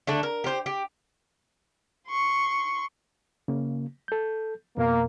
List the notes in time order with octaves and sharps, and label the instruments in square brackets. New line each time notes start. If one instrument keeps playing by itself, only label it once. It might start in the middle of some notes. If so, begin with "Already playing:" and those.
[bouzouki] D3 A3 D4
A#4
G4 C5
G4
[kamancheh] C6 C#6
[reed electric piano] C#3 A#3
A4 G6
[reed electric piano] F2 B2 [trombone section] A#3